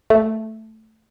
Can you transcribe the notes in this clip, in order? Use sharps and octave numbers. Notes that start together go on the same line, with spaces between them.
A3